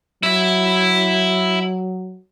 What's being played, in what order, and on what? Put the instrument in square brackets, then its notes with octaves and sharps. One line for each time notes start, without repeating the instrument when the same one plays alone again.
[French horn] F#3 [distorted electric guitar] E4 E5